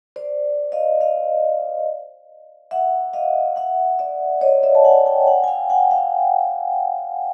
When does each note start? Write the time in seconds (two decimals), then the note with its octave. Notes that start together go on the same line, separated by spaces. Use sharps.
0.16 C5 D5
0.72 D#5 F5
1.01 D#5 F5
2.71 E5 F#5
3.13 D#5 F5
3.56 E5 F#5
3.99 D5 E5
4.41 C#5 D#5
4.63 D5 E5
4.75 A5
4.84 F#5 G#5
5.06 G5 A5
5.27 F#5 G#5
5.44 G#5
5.48 F5 G5
5.70 F#5 G#5
5.91 F5 G5